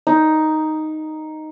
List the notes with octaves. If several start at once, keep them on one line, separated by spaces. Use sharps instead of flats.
D#4